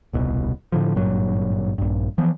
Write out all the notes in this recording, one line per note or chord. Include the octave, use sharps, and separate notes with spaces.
D#1 C2 B2
A2 D3 F3
G#1 G2 A#2 F#3
A#1 G2
E3 F3 B3